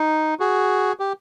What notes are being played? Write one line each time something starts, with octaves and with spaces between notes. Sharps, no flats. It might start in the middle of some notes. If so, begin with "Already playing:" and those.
Already playing: D#4
F#4 G#4
G4